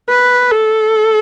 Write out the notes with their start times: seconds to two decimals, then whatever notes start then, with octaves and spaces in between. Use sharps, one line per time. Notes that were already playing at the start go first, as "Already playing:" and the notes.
0.09 B4
0.51 A4